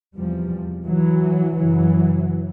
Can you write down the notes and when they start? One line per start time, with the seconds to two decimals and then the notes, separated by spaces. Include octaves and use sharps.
0.16 E2 C3 F3 G3
0.86 E3 F#3
1.56 F#2 C#3 E3 F#3